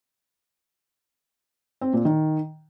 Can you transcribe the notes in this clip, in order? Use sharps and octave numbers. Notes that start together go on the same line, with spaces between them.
C4
A#2
D#3